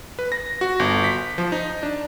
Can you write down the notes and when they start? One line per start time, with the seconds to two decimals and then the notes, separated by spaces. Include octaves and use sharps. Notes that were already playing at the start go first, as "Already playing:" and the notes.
0.19 B4
0.32 A#6
0.61 F#4
0.79 G1
1.04 B6
1.38 F3
1.52 D#4
1.83 D4